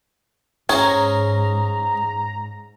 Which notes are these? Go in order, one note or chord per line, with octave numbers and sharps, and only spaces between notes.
G#2 C#4 G#4 C5 A#5